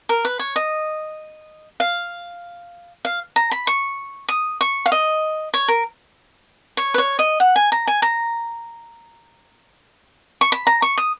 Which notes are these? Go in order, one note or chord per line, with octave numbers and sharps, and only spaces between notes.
A#4
B4
C#5
D#5
F5
F5
A#5
B5
C#6
D#6
C#6
F5
D#5
C#5
A#4
C#5
B4
C#5
D#5
F#5
G#5
A#5
G#5
A#5
C#6
B5
A#5
C#6
D#6